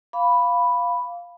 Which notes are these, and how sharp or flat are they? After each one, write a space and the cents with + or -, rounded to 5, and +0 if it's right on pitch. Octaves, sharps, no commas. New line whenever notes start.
F5 +0 B5 +0 D6 -30